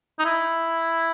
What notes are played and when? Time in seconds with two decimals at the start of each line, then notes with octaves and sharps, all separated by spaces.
0.19 D#4
0.25 E4